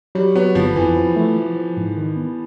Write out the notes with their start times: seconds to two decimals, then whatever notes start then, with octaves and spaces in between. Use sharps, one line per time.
0.15 F#3 G3
0.35 F#3 B3
0.55 G1 F3
0.76 F2 E3
0.96 F3
1.16 A3
1.36 F3
1.56 F3
1.77 G#2
1.97 D#3
2.16 B3